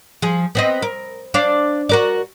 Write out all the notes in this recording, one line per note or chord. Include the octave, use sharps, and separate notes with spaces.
F3 G#4
B3 C4 D#5
A#4
D4 C5 F5
F#4 A#4 D5